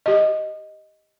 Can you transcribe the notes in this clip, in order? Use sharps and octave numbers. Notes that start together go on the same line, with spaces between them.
G4 D#5